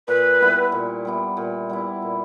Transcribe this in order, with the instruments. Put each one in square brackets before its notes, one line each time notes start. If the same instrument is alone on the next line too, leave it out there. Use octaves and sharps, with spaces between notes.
[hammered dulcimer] A#2 [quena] B4
[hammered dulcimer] G3 B3 E4
A#2
G3 B3 E4
A#2
G3 B3 E4
A#2